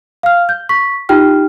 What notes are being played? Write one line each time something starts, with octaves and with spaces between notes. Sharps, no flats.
F5 F6
G6
C#6 B6
D#4 F4 G4 G5 F6